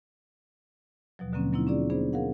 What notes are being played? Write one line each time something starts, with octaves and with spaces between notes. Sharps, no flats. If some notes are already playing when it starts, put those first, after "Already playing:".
D#2 B2 F3 F#3
B2 D3 F#3 A#3 C4 C#4
F#3 A#3 C4 D#4 E4
C#4 D4 F4 G#4 D5
B3 D4 G#4 C5
G#4 A#4 F5 F#5